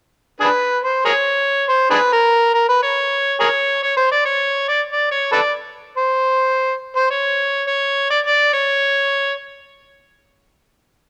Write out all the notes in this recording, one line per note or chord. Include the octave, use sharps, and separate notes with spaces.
D4 G#4 B4
C5
G#4 A#4 C#5
C5
D4 G#4 B4
A#4
A#4
B4
C#5
G#4 A#4 C#5
C#5
C5
D5
C#5
D5
D5
C#5
A4 B4 D5
C5
C5
C#5
C#5
D5
D5
C#5